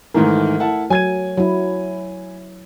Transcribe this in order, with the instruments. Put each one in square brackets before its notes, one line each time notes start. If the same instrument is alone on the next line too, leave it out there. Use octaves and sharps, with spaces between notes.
[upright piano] G#2 D#3 E3 [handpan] A3 A#4
[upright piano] E4 F#5 A5
[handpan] F#3 [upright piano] G#5 G#6 D#7
[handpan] F#3 E4